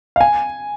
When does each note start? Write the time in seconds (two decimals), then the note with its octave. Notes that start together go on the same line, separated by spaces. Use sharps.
0.16 F5
0.21 G#5